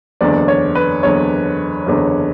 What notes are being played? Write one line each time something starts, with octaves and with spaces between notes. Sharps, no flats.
F#1 E2 D3 D5
C#5
B4
F#1 E2 D3 C#5
F#1 E2 D3